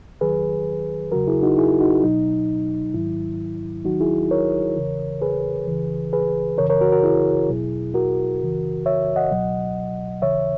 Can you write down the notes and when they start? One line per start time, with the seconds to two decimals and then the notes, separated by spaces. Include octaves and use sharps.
0.21 E2 D#3 F#3 G#4 B4
1.12 E2 C#3 F#3 F#4 A#4
1.27 E4 G#4
1.42 D#4 F#4
1.58 E4 G#4
1.80 D#4 F#4
2.03 C#2 B2 F#3 D#4
2.94 G#2 D#3 F#3 E4
3.85 D#2 D#3 F#3 D#4 F#4
4.01 E4 G#4
4.31 A#4 C#5
4.76 E2 C#3 E3
5.21 G#4 B4
5.67 C#2 C#3 E3
6.13 G#4 B4
6.58 F#2 C#3 E3 A#4 C#5
6.70 A#4 C#5
6.81 F#4 A#4
6.92 F#4 A#4
7.03 E4 G#4
7.49 E2 B2 F#3
7.94 F#4 A#4
8.40 F#2 C#3 E3
8.86 C#5 E5
9.16 D#5 F#5
9.31 C#2 B2 F#3
10.22 D#2 C#3 E3 C#5 E5